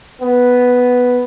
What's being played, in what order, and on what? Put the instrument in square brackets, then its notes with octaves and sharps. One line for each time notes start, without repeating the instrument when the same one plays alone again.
[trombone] B3